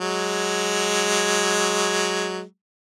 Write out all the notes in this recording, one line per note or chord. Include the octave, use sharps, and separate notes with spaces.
F#3 G#3